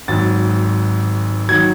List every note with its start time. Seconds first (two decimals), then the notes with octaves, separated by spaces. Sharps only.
0.08 G#1 G#2 F#3 A6
1.49 D#3 F#3 G#6